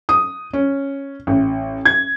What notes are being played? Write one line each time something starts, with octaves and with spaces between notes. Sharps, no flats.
D#6
C#4
A1
G#6